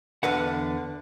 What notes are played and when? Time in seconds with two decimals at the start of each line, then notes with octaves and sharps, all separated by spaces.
0.23 E2 D3 B4 F#5